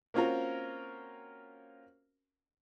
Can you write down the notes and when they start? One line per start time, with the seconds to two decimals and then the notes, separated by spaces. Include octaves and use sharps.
0.14 A#3 C4 C#4 F4 F#4 A#4